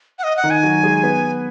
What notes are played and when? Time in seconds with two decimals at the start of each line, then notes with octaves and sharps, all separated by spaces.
0.19 F#5
0.24 D#5
0.37 F#5
0.43 D#3 D#4
0.50 G#5
0.63 F#3 F#4
0.83 G#3 G#4
1.03 B3 B4